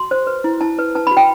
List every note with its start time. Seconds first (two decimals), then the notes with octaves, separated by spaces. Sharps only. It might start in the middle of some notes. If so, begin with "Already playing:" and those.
Already playing: F#4 C6
0.11 C5
0.27 B4
0.44 E4
0.61 E4 A5
0.79 B4
0.95 B4 A5
1.07 B5
1.11 F#4
1.17 G5